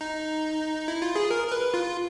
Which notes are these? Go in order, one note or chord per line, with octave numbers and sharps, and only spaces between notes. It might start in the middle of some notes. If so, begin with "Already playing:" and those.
D#4
E4
F4
G#4
A#4
A#4
B4
F4